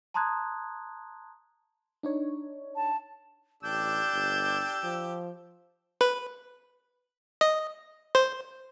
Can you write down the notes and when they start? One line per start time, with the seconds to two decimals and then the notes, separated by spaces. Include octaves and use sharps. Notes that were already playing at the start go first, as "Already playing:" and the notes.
0.14 A5 A#5 C6 D#6 F#6 G#6
2.03 D4 D#4 C#5
2.76 A5
3.63 A1 D4 G4 E6 G6
4.13 G1
4.84 F3
6.01 B4
7.41 D#5
8.15 C5